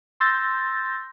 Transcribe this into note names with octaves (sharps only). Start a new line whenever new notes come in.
C6 E6 G6 A6 A#6